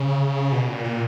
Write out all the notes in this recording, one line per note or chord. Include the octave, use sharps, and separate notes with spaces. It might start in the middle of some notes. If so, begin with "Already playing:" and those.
Already playing: C#3
B2
A#2
A#2